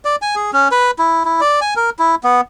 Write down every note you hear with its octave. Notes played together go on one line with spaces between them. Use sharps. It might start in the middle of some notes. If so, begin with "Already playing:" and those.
D5
G#5
G#4
C#4
B4
E4
E4
D5
G#5
A#4
E4
B3